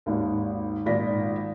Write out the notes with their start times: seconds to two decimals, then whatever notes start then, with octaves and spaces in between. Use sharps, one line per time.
0.06 G#1 D#2
0.86 G#1 A#2 D5 A#6 B6